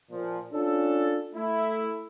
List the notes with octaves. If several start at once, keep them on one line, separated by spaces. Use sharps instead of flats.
A#2 F3
C#4 D4 F4 A4
A3 E4